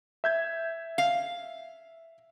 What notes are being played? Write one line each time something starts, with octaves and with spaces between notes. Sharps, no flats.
E5 G6 G#6
F5